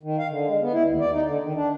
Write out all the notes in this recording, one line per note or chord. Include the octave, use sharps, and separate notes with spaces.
D#3
F5
D3
G#3
B3
E4
D#2
D5
D#4
D3
D#3
D4